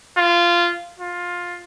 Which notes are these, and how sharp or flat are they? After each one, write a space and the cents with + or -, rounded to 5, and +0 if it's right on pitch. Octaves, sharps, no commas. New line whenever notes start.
F4 -15
F4 +15